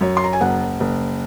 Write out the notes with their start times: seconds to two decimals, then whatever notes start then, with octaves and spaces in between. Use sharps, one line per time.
0.01 F#2 C#5
0.17 C6
0.24 A#5
0.33 G#5
0.40 F#1 F#5
0.80 F#1